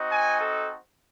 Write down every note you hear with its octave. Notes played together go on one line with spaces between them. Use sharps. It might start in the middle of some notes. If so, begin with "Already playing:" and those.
Already playing: C4 D#4 F#4
G#5
A4